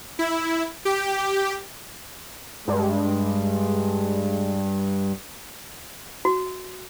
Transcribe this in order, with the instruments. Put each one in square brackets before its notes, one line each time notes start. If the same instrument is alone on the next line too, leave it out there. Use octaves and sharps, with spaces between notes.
[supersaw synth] E4
G4
[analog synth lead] G2 [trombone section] G#3
[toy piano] F#4